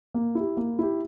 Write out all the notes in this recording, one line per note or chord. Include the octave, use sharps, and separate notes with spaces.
A#3
E4
G4
A#3
E4 G4